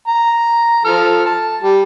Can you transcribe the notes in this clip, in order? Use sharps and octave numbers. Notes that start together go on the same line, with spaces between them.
A#5
F3 A4 F6
A5
G3